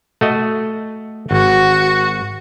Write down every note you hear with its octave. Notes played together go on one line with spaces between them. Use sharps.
A3 F#4 D#5
G#1 F#4